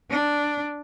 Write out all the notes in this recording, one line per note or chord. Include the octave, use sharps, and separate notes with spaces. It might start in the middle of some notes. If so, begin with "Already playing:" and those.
D4